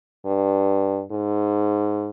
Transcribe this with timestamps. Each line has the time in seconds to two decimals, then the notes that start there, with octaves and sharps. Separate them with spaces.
0.26 G2
1.11 G#2